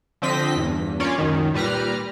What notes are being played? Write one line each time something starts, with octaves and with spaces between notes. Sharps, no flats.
D3 F3 C4 D#5 B6
E2 G2
A#3 C#4 F4 C#5 D5
C#2 F#2 D#3
A#2 G3 B4 A#5 F6